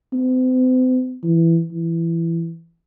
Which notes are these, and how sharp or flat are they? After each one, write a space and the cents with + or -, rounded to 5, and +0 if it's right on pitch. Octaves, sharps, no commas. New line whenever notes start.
C4 -40
E3 +10
E3 +15